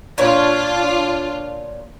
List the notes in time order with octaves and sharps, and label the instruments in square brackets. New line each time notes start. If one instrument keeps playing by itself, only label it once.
[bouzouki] A#2 C#5 [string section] D4 F4